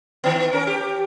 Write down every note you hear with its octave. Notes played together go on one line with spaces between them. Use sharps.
D#3 B3
C#4 A#4
G4